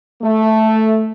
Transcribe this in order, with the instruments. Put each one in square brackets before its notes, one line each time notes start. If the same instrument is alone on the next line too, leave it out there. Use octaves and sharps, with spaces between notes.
[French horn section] A3